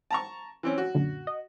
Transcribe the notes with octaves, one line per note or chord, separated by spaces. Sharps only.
A5 A#5 C#6
E3 C4 C#4
F#4
F#2 A#2 D3
D#5